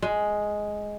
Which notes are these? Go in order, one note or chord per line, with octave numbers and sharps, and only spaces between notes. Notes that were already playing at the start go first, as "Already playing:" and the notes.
G#3